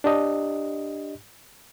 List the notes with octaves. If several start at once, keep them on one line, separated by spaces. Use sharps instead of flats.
D4 G4 D#5